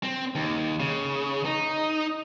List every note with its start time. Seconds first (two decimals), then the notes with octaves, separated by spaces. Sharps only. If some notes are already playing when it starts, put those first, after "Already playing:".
0.03 C4
0.35 D#2
0.80 C#3
1.45 D#4